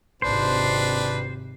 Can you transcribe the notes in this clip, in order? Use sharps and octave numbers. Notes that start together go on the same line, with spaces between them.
G#1 C3 D4 B4 C5